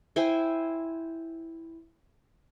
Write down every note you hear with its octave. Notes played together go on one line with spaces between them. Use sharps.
E4 C5 G5 G#5